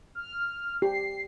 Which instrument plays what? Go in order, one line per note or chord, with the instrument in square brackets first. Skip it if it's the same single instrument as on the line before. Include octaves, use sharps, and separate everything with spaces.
[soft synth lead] F6
[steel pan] G4 [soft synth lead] C7